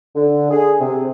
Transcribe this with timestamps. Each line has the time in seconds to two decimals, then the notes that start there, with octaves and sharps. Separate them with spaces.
0.16 D3
0.51 G#4
0.80 C3